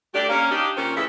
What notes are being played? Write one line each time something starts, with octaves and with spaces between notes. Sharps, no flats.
A3 D4 G4
A#3 C#4
D4 D#4 G4
A#2 F3 C4 C#4
C#3 E3 F3 G#3 A3 E5